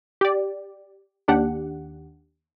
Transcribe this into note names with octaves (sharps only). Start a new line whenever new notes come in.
G4 D5
D#2 D4 G4 F#5